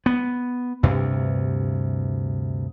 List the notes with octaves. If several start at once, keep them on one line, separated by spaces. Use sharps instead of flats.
B3
D2 G2 C3